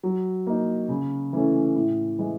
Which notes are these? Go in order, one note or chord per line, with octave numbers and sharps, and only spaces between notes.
F#3
A#3 D#4
C#3
E3 A3 C#4
A2
E3 G#3